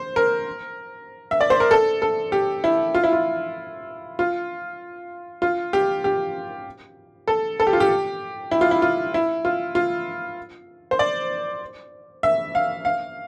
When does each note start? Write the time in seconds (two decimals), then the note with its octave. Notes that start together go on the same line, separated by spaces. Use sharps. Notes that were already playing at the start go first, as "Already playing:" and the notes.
Already playing: C5
0.16 A#4
1.31 E5
1.41 D5
1.50 C5
1.60 A#4
1.71 A4
2.02 A4
2.32 G4
2.64 E4
2.94 F4
3.04 E4
3.13 F4
4.19 F4
5.42 F4
5.73 G4
6.04 G4
7.28 A4
7.60 A4
7.67 G4
7.73 F4
7.80 G4
8.51 E4
8.61 F4
8.71 E4
8.82 F4
9.14 E4
9.45 F4
9.75 F4
10.91 C5
10.99 D5
12.23 E5
12.55 F5
12.85 F5